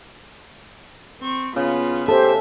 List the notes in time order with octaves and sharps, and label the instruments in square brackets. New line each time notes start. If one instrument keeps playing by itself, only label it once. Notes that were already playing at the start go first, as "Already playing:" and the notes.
[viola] C4 C#6
[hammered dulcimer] C#3 [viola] B3 F4
[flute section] G4 C5 [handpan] A4 [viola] E5 [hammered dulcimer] A5